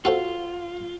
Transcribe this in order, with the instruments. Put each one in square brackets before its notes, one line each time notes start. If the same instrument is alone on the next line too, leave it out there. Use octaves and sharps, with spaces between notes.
[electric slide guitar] F4 [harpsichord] F#4 A4 C5